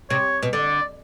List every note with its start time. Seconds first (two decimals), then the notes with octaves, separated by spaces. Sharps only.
0.10 C3 C#5
0.43 B2
0.53 D3 D5